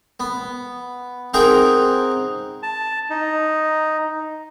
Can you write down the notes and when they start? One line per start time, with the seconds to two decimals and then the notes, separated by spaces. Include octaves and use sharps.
0.20 B3
1.34 C4 D#4 G#4 A#4 F#5 G5
2.63 A5
3.10 D#4